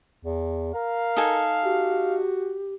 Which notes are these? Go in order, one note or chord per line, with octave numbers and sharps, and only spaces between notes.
E2
A#4 F5
D#4 A4 G#5
F#4 G4